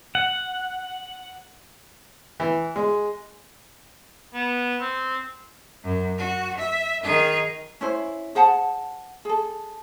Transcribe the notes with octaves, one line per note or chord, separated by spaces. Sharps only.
F#5
E3
G#3
B3
C4
F#2
F#4
E5
D#3 G#4
C#4 E4 C5
G#4 C5 F#5 A5
G#4 A4